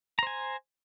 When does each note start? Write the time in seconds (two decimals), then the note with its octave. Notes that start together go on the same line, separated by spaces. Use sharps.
0.19 A#5
0.23 C5
0.27 G#5